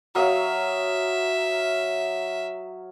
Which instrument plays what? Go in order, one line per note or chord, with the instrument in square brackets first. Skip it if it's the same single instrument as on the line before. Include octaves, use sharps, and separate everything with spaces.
[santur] F#3 F5 D#6 [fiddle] E5